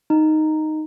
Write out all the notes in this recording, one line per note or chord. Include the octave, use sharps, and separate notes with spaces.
D#4